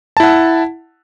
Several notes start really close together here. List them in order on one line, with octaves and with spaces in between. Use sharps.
A5 E4 F#5